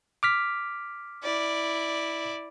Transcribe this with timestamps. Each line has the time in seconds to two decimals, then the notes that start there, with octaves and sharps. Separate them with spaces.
0.23 D6 F6 B6
1.23 E4 D5